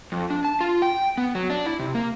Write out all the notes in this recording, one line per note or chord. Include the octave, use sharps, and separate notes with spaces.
F2
D4
A5
F4
G5
B3
F#3
D4
E4
C3
A#3